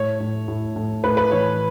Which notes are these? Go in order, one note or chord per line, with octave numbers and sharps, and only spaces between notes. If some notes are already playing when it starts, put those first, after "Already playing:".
Already playing: A2 C#5
A2
A2
A2
A2 B4
B4
E3 C#5